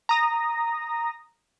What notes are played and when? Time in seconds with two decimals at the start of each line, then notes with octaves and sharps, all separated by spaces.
0.09 A#5 D#6 A#6